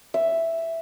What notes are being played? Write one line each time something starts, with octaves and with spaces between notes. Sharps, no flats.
E5